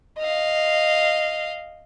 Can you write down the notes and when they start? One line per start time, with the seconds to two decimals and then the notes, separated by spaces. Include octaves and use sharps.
0.19 D#5 F5